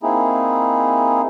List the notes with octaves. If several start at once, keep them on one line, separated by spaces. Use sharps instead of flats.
A#3 C4 D#4 E4 G#4